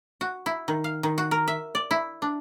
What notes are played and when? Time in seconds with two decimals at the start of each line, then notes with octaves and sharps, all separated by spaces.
0.21 F#4
0.46 E4
0.68 D#3
0.84 F5
1.03 D#3
1.18 F#4
1.31 A#4
1.48 E5
1.75 D5
1.91 E4
2.22 D4